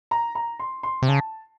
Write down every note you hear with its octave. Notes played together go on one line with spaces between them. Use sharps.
A#5
A#5
C6
C6
C3
C#3 A5